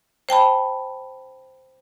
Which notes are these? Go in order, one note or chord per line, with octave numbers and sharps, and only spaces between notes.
C5 G5 A5 B5